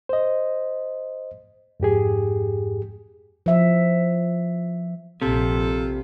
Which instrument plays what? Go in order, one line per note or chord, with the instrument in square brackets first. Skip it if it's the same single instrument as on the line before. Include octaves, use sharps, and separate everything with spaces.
[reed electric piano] C5 D#5
F2 G#2 G4 G#4
[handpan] F3 E5
[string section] A#1 [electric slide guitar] C3 [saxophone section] F4 A4